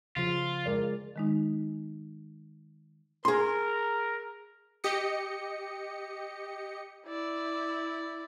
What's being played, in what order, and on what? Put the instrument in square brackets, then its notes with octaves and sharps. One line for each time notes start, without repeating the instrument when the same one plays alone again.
[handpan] C#3 F3 [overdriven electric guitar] F4
[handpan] G#3 A#4 D5
[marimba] D#3 G#3 D#4
[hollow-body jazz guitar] G#4 C6 [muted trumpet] A#4
[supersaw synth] G4 D#5 C#7
[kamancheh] E4 D5